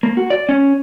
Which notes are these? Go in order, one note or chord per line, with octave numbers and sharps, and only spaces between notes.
A#3
F#4
D5
C#4